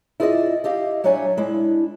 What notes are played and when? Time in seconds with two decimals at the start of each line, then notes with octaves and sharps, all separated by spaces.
0.20 E4 F4 G#4 B4 D5 D#5
0.64 E4 G4 D#5 F5
1.04 F#3 G3 D4 C#5 E5 G#5
1.37 G#3 D4 E4